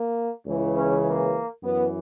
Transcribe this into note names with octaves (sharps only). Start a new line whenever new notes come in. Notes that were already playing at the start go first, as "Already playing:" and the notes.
Already playing: A#3
C#2 C#3 E3
C#4
A#3
F#2 E3 B3